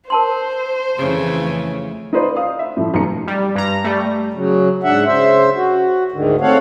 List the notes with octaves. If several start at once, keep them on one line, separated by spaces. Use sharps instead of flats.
A#4 C5 A5 C6
F2 C#3 E3 A3
D#4 F4 B4 C5 D5
F5 D#6
E5
A2 F3
E1 B1 A#5 C#7
G3
G2 A#5
G3 A3
C#3 F#3
G#2 D4 E5 F#5
C#3 C5 E5
F#4
D2 G#2 D3 D#3
A3 C4 A4 C#5 F5 F#5